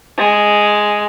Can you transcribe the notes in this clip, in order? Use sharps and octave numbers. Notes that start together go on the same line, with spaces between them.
G#3